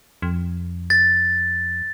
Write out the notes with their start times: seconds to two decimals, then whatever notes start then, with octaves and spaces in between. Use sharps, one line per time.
0.22 F2
0.90 A6